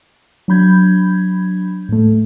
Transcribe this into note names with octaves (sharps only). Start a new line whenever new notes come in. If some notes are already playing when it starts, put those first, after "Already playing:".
F#3 D4 B5 G6 G#6
A2 A3